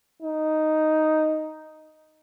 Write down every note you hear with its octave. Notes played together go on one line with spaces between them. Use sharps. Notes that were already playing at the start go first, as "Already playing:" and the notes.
D#4